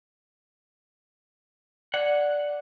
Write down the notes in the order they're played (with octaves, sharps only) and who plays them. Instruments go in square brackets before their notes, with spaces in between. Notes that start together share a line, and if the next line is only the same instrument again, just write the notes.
[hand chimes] D5 [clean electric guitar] F#5